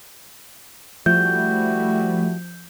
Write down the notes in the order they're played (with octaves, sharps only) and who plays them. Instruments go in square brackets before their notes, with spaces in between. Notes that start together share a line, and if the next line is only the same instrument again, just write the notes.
[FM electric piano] F3 [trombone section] G3 E4 F#4 [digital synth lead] A3 [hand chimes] G6